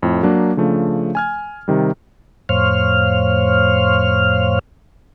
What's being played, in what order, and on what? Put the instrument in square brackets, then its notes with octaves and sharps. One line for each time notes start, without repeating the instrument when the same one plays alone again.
[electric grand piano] F2 A2
F#3 A#3 D4
C#3 F3 A3 D4
G#5 F6 G#6
C3 D#3 G3
[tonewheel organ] F2 A2 C5 C#5 F5 F6